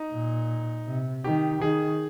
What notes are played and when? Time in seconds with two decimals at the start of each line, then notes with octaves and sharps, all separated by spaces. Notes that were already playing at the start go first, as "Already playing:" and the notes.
Already playing: D#4
0.12 A#2
0.87 C3
1.24 D#3 G4
1.62 D#3 G#4